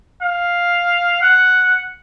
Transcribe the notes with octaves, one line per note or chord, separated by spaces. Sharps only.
F5
F#5